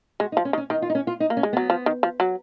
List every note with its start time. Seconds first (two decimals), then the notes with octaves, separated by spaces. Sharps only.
0.20 G#3 F#4
0.32 D#4
0.37 F3
0.45 C#4
0.53 D#3
0.58 C#4
0.70 D#3 D#4
0.82 F4
0.90 D#4
0.95 C#4
1.07 F4
1.20 D#4
1.30 A#3
1.37 C#4
1.43 G#3
1.53 F#3 B3
1.70 F3
1.86 D#3
2.03 F3
2.20 F#3